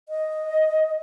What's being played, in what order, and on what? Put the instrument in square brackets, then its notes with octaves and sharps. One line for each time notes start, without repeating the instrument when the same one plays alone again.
[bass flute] D#5